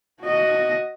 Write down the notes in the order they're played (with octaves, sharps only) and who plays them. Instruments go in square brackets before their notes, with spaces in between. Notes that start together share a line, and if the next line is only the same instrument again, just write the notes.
[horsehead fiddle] F#4 D#5